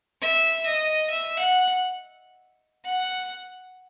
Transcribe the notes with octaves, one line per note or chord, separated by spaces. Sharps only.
E5
D#5
E5
F#5
F#5